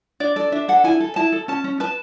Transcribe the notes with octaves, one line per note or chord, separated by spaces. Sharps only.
D4 D5
A4 D5
D4 E5
A4 F#5
E4 G#5
A4
E4 A5
A4
C#4 A5
C#4
B4 A5